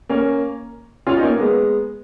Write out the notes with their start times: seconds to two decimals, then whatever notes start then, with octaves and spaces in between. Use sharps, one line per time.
0.09 A#3 C#4
1.07 C#4 F4
1.17 D#4
1.23 A#3 C#4
1.35 A#3
1.39 G#3 B3